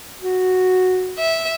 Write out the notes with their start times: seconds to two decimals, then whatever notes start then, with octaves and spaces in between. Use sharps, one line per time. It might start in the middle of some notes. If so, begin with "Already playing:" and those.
0.21 F#4
1.19 E5